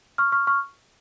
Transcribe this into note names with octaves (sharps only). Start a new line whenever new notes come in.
C#6 F6
C#6 F6
C#6 F6